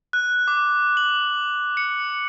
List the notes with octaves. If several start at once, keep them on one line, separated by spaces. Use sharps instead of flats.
F#6
D6
F#7
C#7